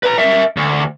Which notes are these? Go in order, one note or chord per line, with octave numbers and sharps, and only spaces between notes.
B4 A#5
A#4 E5
D2